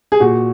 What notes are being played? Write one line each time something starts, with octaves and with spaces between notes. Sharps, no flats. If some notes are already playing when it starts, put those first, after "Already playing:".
G#4
A#2 F#4